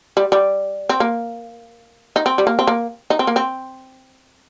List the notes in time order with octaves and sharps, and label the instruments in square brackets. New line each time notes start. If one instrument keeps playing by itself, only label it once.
[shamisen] G3
G3
C4
A#3
D#4
C4
G3
A#3
C4
A#3
D#4
C4
A#3
C4